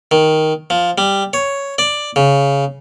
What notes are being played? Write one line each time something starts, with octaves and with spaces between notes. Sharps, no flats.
D#3
F3
G3
C#5
D5
C#3